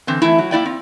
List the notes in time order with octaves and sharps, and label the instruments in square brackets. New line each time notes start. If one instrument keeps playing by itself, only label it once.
[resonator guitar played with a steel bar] D3 E3 C4
E3 A3 E4
F#3
A#3 E4 D5 G5
C4